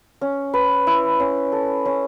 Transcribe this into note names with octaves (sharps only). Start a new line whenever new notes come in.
C#4
B4
E4
C#4
A4
C#4